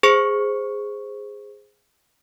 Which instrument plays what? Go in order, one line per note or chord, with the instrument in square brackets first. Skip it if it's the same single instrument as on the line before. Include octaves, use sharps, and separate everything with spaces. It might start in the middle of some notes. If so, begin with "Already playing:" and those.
[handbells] G#4 C5 C#6 C#7